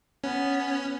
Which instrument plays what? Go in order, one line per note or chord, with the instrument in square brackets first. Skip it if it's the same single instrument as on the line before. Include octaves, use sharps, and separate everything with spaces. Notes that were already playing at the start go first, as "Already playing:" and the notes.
[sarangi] B3 [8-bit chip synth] C#4